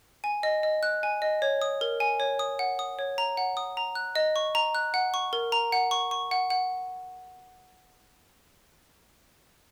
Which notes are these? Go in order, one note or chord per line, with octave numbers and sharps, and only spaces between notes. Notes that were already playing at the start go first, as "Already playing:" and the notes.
G#5
D#5
D#5
F#6
G#5
D#5
C#5
D#6
A#4
G#5
C#5
D#6
F#5
D#6
C#5
A#5
F#5
D#6
A#5
F#6
D#5
C#6
A#5
F#6
F#5
C#6
A#4
A#5
F#5
C#6
C#6
F#5
F#5